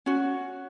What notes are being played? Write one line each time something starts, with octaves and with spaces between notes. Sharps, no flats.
C#4 F#4